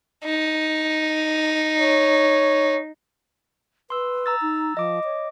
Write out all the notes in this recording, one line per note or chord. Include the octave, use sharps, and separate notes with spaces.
D#4
C#5
B4 C6 E6
A#5 E6 A6
D#4
F3 D#5 D6
C#5